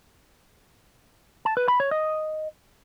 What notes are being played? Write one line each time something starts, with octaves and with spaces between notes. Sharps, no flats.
A5
B4
B5
C#5
D#5